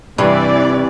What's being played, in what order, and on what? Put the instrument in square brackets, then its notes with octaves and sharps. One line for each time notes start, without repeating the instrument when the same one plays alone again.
[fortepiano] G2 [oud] C3 [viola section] E3 D5